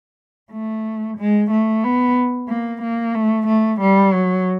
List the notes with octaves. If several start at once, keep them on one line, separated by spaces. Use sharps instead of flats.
A3
G#3
A3
B3
A#3
A#3
A3
A3
G3
F#3